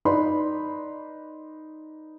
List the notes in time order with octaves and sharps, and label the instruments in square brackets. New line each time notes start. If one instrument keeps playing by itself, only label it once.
[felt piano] D#4 B4 D5 B5 C6